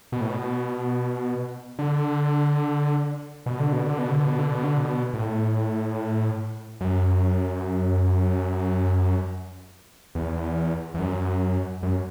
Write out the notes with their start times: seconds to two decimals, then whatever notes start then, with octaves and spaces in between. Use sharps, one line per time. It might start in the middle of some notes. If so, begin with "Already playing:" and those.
0.12 B2
0.21 A2
0.29 B2
1.79 D3
3.46 B2
3.59 D3
3.72 B2
3.86 D3
3.99 B2
4.11 D3
4.25 B2
4.39 D3
4.51 B2
4.64 D3
4.77 B2
5.13 A2
6.81 F#2
10.15 E2
10.94 E2
10.99 F#2
11.83 F#2